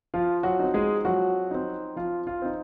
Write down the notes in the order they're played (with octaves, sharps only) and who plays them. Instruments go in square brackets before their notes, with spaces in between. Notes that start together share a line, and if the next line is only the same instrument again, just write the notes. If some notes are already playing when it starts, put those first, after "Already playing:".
[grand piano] F3 F4
F#3 F#4
C4 D#4
G#3 G#4
F3 F#3 F#4
C4 D#4
F3 F4
F4
C4 D#4